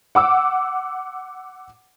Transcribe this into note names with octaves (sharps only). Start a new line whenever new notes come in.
F#5 D6 E6